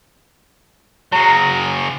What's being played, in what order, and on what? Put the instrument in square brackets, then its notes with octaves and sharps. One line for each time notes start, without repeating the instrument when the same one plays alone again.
[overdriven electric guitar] C#3 F#3 [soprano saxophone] A#5